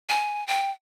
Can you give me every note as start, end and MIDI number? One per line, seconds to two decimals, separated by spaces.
0.09 0.46 80
0.47 0.71 79